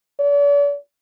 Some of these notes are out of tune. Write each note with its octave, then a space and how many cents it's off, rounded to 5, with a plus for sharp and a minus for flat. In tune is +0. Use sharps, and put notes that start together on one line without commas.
D5 -45